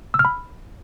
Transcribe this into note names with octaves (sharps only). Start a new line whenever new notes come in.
E6
F6
B5